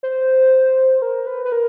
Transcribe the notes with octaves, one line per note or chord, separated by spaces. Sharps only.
C5
A#4
B4
B4
A#4